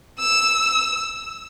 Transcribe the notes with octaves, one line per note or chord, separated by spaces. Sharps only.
E6